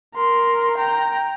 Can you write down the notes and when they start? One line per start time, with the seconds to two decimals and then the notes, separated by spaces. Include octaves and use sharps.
0.15 A#4 C6
0.78 G5 A#5